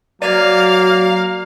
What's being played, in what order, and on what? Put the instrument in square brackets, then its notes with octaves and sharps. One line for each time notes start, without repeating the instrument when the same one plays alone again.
[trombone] F#3 [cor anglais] A#3 [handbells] D5 G#6 [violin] F5